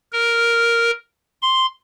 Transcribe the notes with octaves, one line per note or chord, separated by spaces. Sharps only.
A#4
C6